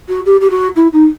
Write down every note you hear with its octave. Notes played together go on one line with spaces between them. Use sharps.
F#4
G4
G4
F#4
E4
D#4